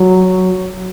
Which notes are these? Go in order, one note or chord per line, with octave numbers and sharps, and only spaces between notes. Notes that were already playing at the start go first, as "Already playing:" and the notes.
Already playing: F#3